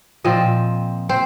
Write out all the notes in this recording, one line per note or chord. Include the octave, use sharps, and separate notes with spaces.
A#2 F3 C4 D#5
C4 C5